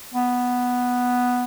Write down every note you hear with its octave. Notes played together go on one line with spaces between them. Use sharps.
B3